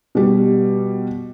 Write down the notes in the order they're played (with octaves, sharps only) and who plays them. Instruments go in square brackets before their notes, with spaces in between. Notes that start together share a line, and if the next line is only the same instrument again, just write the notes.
[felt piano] B2 G3